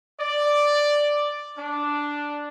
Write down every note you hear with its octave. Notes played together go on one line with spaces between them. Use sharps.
D5
D4